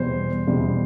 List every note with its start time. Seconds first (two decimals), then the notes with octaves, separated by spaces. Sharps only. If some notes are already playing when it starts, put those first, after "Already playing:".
Already playing: E2 B2 G3 C5
0.47 E2 B2 G3